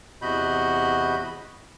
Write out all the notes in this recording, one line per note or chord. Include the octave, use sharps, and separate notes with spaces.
E2 C3 F#4 D#5 B5 G6